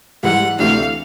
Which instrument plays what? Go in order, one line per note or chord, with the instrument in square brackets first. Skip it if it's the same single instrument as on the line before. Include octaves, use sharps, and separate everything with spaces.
[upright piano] G#2 E3 G3 [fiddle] F#5
[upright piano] D2 C3 E3 A3 D4 [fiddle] F5